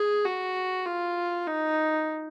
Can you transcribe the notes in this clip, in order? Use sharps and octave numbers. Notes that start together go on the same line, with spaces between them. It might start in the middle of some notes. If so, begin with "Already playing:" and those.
Already playing: G#4
F#4
F4
D#4